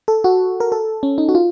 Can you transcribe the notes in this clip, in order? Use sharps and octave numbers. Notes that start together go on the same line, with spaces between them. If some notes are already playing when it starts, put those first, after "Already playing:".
A4
F#4
A#4
A4
C#4
D#4
F#4
F4